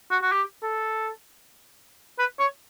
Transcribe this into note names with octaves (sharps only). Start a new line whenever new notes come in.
F#4
F#4
G4
A4
B4
C#5